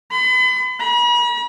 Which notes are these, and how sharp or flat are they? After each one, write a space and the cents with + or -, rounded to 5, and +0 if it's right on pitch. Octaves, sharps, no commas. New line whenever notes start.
B5 +40
B5 -45